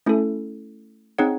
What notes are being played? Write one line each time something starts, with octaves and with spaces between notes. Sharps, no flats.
A3 C#4 E4 A4
C4 D#4 G#4 C#5 F#5